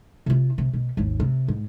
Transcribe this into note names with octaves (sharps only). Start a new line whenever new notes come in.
C3 F4
C3
B2
G#1 D#2
C3
G#2